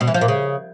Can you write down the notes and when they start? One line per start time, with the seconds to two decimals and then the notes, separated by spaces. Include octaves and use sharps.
0.01 B2
0.07 E3
0.14 F3
0.21 A#2
0.28 C#3